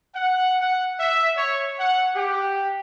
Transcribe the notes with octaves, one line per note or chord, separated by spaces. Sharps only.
F#5
F#5
E5
C#5
F#5
G4